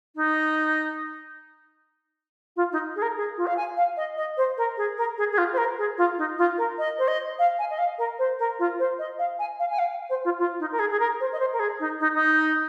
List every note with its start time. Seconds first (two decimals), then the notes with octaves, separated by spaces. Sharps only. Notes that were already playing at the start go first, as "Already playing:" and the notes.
0.16 D#4
2.56 F4
2.72 D#4
2.96 G#4
3.02 A#4
3.17 G#4
3.38 F4
3.47 F5
3.57 G#5
3.77 F5
3.97 D#5
4.17 D#5
4.37 C5
4.57 A#4
4.77 G#4
4.97 A#4
5.18 G#4
5.32 G#4
5.38 F4
5.53 C5
5.58 A#4
5.78 G#4
5.98 F4
6.18 D#4
6.38 F4
6.58 A#4
6.78 D#5
6.99 C5
7.08 D#5
7.39 F5
7.59 G#5
7.71 D#5
7.79 F5
7.98 A#4
8.19 C5
8.39 A#4
8.59 F4
8.79 C5
8.99 D#5
9.19 F5
9.39 G#5
9.59 F5
9.71 G#5
9.79 F5
10.10 C5
10.25 F4
10.39 F4
10.60 D#4
10.72 A#4
10.79 G#4
10.91 G#4
11.00 A#4
11.20 C5
11.33 D#5
11.40 C5
11.53 A#4
11.60 G#4
11.80 D#4
12.00 D#4
12.14 D#4